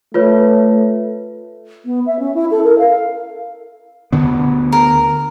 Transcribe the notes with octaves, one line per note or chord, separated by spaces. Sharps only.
A3 F4 B4 C#5
B3
E5
C#4
E4
A4
A#4
F5
D2 D3 B3
A#4